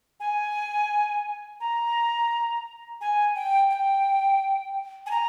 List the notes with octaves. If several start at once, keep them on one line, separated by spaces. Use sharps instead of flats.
G#5
A#5
G#5
G5
G5
G#5
A#5